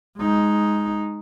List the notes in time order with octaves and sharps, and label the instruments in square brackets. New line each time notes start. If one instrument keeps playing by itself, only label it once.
[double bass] G#3 D#4